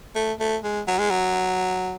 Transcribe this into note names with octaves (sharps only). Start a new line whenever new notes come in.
A3
A3
G#3
F#3
G#3
F#3